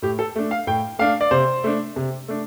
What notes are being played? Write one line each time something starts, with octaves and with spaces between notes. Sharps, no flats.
A2 G4
A4
A3 D4
F5
A2 G5
A3 D4 F5
D5
C3 C5
A3 D4
C3
A3 D4